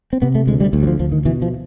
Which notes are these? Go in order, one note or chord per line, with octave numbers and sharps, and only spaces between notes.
C4
C3 B3
A3
D2 G#3
G3
D2
F#3
F3
D2 F3
D#3
B2 E3
F3